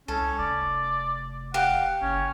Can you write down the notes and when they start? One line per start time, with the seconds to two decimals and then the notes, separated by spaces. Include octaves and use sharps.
0.08 C2 C#4 A4
0.38 F1 D5
1.54 G4 F5 F#5
2.02 F#1 C#4